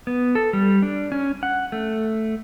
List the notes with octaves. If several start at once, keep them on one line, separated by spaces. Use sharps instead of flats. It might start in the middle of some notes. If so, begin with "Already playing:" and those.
B3
A4
G3
D4
C#4
F#5
A3